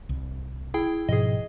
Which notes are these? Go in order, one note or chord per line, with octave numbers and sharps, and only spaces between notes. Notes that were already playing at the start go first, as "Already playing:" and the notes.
C2
E4 G#4 G5
G#2 B2 F3 G#4 D#5